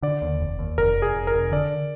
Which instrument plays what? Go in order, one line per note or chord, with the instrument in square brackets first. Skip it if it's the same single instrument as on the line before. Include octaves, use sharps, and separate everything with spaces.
[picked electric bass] D3 [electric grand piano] D5
[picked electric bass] D#2
F1
D#2
[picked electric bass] F1 [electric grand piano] A#4
[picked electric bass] F1
[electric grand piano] G#4
[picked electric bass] F1
[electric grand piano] A#4
[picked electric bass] F1
[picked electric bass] D3 [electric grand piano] D5